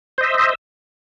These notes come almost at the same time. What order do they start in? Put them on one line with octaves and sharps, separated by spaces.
C5 D#5 E5